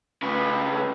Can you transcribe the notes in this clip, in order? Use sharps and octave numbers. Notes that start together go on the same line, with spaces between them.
C#3 B4